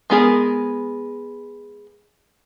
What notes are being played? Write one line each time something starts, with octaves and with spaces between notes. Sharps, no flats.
G#3 B3 G#4 A#4